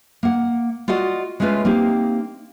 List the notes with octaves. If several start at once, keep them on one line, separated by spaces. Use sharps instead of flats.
A#3 F#5
F4 F#4 D5 D#5 F#5
G#3 A3 C#4 F4 B4
A#3 C4 D#4 G4